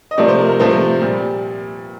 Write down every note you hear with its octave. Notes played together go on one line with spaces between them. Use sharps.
D#5
C3 F3 A3 D5
C5
A#4
A#4
C3 F3 A3 C5
A#2 G3